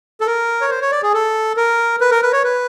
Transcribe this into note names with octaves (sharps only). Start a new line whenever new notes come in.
A4
A#4
C#5
C5
C#5
D5
G#4
A4
A#4
B4
A#4
B4
C#5
B4